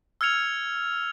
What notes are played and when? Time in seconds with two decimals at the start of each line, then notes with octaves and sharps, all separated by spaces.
0.21 E6 F6 G#6 C#7 F7